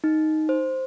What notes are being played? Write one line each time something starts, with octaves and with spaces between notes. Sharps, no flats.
D#4
C5